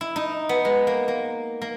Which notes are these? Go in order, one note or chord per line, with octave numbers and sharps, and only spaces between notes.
E4
D#4
B3
G#3
A#3
A#3
A#3